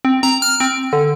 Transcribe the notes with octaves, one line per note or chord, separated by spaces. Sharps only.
C4
A#5
F6
C4
D3